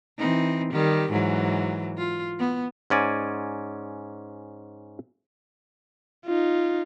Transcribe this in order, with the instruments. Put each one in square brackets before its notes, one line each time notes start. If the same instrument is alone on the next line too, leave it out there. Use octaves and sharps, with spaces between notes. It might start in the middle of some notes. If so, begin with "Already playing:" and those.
[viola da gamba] E3 C4 D#4
D#3 G3 G4
G#2 E3 F#3
F4
B3
[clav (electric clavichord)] G#2 C#4 D5 G#5
[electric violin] D#4 F4